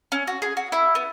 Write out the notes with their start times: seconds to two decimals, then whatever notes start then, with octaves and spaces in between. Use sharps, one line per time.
0.12 C#4
0.27 F#4
0.42 G#4
0.57 F#4
0.72 E4
0.95 B3